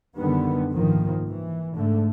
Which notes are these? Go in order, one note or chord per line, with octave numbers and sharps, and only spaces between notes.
F#2 D3 D#3 G3 B3
C2 G#2 D#3 F3 A#3
E3
G#2 D3 A3